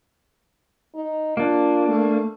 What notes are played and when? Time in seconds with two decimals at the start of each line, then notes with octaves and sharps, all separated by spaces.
0.95 D#4
1.37 A#3 D4 F4
1.88 A3